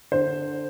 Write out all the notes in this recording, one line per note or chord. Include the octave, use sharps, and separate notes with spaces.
D3 C5